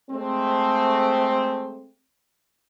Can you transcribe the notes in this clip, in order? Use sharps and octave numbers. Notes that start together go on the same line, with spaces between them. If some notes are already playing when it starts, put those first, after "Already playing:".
G#3 A3 C4